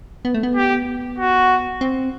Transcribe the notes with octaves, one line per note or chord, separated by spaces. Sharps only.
B3
A3
B3
G4
F#4
C4